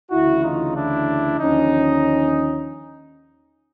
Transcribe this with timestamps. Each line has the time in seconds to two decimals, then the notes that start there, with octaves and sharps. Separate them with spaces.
0.11 D2 C#3 E3 E4 F#4
0.43 D#4 F4
0.75 D4 E4
1.39 D#2 D3 F3 C#4 D#4